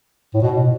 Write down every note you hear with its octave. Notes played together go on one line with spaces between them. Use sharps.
A2
B2